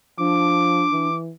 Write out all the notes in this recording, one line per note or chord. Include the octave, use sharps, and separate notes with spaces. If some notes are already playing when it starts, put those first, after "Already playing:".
F3 D4 D6
E3